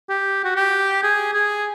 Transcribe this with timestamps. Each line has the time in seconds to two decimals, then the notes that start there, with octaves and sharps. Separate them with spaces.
0.09 G4
0.44 F#4
0.56 G4
1.03 G#4
1.33 G#4